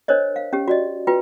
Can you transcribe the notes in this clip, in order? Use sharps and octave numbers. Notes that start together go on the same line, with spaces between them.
D4 A#4 C5 C#5 D#5
F5
C#4 G4
F#4 D5 D#5
F4 F#4 B4 G5